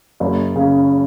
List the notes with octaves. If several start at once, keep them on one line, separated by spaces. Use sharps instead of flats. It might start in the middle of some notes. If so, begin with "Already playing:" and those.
F#1
C#3